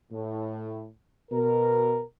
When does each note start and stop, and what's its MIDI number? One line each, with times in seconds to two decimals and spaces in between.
0.12 0.87 45
1.32 2.01 47
1.32 2.01 70